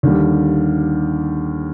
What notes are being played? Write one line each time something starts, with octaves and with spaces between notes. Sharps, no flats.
D#2 D3 G3